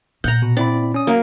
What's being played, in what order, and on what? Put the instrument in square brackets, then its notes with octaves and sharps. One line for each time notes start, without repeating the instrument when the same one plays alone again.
[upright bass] A#2 [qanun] F#5 A#5 [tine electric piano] G6
[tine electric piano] B2
[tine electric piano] C4 E4 B5 [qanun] D5
[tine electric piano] C#4 D#6
[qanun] F#3 A#3